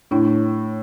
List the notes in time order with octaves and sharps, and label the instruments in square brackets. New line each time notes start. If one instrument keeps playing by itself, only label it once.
[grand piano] A2 [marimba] D4 E4